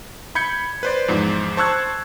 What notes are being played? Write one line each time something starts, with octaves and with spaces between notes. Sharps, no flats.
B5 G6 G#6 C#7
B4 C5 D5
E2 G#2 F3
C5 A5 C#6 E6 F#6 G#6